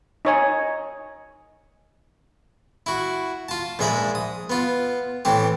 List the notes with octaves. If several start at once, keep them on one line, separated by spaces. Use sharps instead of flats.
D#4 C#5 G#5
E4 F#4
F4 A5
A#1 G#2 G#3 E5 A#5 B5
D#6
B3 F4
A2 E3 C4 G4